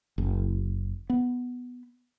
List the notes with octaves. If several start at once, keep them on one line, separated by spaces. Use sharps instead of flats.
F#1
B3